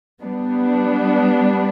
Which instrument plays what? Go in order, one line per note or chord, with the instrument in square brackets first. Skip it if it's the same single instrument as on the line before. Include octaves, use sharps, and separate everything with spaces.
[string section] G3 B3 D4